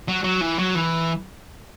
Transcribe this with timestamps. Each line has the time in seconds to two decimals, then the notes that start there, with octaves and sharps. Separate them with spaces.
0.08 F#3
0.24 F#3
0.41 E3
0.59 F#3
0.76 E3